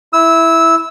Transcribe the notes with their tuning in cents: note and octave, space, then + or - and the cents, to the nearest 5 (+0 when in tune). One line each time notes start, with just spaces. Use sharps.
E4 +0 E6 -15